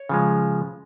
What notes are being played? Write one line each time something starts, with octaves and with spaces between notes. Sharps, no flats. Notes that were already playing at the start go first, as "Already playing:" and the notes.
Already playing: C#5
C#3 F3 G#3